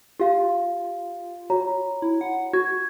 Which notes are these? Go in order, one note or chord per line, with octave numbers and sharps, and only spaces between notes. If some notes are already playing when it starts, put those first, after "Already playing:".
F4 G4 F5
F#4 C#5 A#5
E4
F#5
F#4 G#6